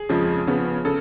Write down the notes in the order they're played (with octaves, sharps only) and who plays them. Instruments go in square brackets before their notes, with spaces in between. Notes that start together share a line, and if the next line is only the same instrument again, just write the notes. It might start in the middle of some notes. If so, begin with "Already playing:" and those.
Already playing: [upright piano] G#4
F2 C#3 F3 G#3
C#3 F3 B3
C#3 A4